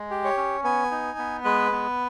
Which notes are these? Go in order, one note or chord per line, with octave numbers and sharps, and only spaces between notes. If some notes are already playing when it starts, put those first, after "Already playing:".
Already playing: G#3
G4
C#5
C#4
B3 G#5
D#4
B3
G#3 B4
B3